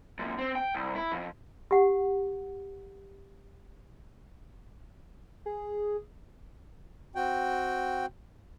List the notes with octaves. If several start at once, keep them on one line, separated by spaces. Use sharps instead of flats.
F#2 A#2
C4
G5
C2
E4
F2
G4 F#5
G#4
C4 F#4 G5